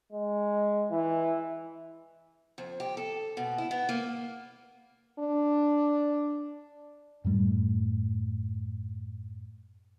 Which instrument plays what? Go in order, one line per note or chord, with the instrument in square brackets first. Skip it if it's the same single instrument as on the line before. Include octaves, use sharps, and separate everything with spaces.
[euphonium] G#3
E3
[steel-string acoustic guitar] F2
G4
A4
B2
E4
B3
A#3
[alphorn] D4
[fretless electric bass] F#2 A2 G3 A3